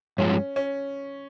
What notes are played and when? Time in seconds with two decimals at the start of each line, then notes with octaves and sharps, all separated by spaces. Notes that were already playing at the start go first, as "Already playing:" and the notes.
0.18 G2 F3 G#3 C#4
0.56 C#4